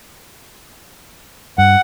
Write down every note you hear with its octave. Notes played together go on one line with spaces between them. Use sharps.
G2 F#5